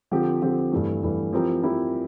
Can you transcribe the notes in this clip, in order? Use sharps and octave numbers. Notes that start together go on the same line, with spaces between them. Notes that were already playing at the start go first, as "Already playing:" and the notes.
D3 F3 C4 G4
D3 F3 C4 G4
G2 E3 A3
G2 E3 A3
F3 C4 E4 G4 A#4
F3 C4 E4 G4 A#4